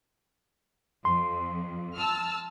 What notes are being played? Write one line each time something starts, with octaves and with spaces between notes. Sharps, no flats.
F2 C6
A5 E6 F6